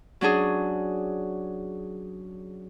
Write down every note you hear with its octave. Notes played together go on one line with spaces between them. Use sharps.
F#3 C#4 D4 G#4